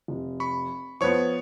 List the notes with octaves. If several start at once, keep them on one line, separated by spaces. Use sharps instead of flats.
F1
B5 C#6
F3 B3 C#5 C#6